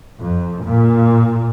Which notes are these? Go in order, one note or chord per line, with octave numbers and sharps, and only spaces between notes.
F2
A#2